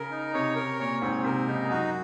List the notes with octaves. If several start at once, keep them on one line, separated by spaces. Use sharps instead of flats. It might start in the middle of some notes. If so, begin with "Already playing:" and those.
Already playing: C#3 A#4
D#4
C3 C#5
A#4
A#2 C#5
G#2 C4
C3 A#4
C#3 D#4
F#2 F#4